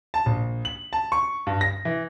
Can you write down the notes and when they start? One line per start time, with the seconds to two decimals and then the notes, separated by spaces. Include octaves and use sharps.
0.14 A5
0.26 A#1
0.65 F#7
0.93 A5
1.12 C#6
1.47 G2
1.61 A#6
1.85 E3